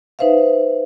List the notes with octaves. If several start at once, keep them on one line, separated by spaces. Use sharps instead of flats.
D#4 B4 C5 E5 F5